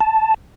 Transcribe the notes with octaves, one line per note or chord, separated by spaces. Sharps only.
A5